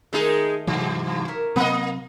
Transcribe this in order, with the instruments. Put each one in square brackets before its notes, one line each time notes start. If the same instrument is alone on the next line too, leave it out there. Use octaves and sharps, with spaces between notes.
[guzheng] D#3 A3 A5 [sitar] G#3 D#4 G#4
[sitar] G2 [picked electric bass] C3 E3 F#3
[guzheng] A#4 C#5 E5
[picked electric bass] C3 F#3 C4 [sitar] A#3 D#5